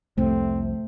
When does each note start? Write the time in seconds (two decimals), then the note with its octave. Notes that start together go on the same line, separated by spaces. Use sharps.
0.18 C2 F2 C3 A3 C4